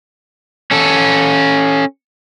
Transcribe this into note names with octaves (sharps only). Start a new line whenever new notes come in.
C#4 A4